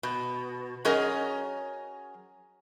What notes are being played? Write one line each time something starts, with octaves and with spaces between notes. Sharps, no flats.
B2
F#3 C#4 G#4 A#4 D#5